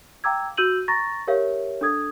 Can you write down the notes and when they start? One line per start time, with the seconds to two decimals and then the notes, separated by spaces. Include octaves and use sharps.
0.24 F5 G5 A#5 D6 E6 G#6
0.57 F#4 E6 G6 D#7 F#7
0.88 A#5 C#6 A6 A#6
1.27 G4 A#4 C#5 E5 F5
1.81 D4 A4 D#6 G#6